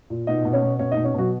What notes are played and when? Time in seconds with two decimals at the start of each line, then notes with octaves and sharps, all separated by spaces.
0.10 A#2
0.27 B2 D#4 D#5
0.45 B2
0.53 C#4 C#5
0.62 B2
0.79 B2 C#4 C#5
0.92 D#4 D#5
0.97 B2
1.04 C#4 C#5
1.14 B2 F#3 F#4